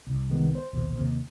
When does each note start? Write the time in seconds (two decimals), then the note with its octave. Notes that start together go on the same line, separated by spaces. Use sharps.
0.07 C2
0.30 D#3 G#3 B3
0.55 C5
0.73 A#1 D#2 B2
0.96 D#2 C3 A#3